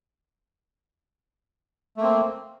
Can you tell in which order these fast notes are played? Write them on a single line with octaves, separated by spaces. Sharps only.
A3 A#3 C4